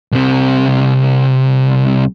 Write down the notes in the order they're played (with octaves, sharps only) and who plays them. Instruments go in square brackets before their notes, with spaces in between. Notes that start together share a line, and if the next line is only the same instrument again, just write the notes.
[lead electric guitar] C2 C3